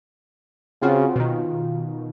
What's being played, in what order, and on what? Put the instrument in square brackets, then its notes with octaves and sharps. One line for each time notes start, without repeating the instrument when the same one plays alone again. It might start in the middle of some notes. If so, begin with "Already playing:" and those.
[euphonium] C#3 [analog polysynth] C4 F4 F#4
[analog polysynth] B2 D#3 [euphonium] F4